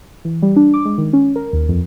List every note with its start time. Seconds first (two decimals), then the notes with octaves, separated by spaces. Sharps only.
0.25 E3
0.42 G3
0.56 D4
0.74 D6
0.85 G#3
0.98 D#3
1.13 C#4
1.36 A#4
1.53 D#2
1.69 F2